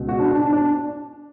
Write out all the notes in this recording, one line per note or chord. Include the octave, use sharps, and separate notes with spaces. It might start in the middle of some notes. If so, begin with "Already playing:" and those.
Already playing: C#2 B2
F#4
D4
D4
D4
D4